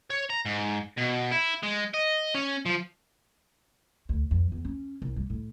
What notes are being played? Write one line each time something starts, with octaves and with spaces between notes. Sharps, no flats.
C#5
A#5
G#2
B2
E4
G#3
D#5
C#4
F3
D2
F2
E2
C#4
C2
G3
A2